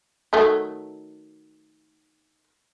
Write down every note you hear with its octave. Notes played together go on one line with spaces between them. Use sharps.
D#3 F#3 A3